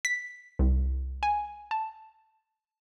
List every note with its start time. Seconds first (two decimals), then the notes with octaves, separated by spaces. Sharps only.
0.05 B6
0.59 C2
1.23 G#5
1.71 A5